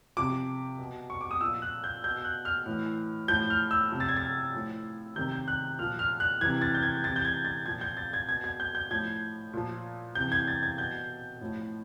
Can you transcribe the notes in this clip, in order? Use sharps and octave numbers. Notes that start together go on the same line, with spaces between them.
C3 F3 D6
B2
C#6
D6
D#6
F3 E6
A#2
F#6
G6
B2 G6
F#6
F6
A2 E3
A2 F3 G6
F6
E6
C3 F3
A6
G#6
A6
A2 F3
C3 D#3 G6
G6
F#6
A#2 F3 F6
F6
F#6
C3 E3 G#6
A6
G6
G#6
C3 E3 A6
G6
G#6
A6
A#2 F3 G#6
G6
A6
G#6
B2 G#6
G#6
G6
G6
A2 F3 G#6
A#2 F3
C3 E3 G6
G#6
A6
G#6
B2 G6
A2 F3